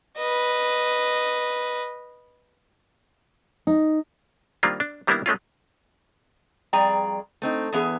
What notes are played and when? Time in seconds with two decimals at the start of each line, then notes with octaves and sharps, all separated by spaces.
0.17 B4 D#5
3.67 D#4
4.63 D#3 G3 A#3 C4 D4 F4
4.80 D4
5.07 D#3 G3 A#3 B3 D4 E4
5.26 G#3 A3 C#4 F4
6.73 F2 G3 G#4 D5 G5 A#5
7.42 A3 C4 D#4
7.72 E2 E3 B3 G#4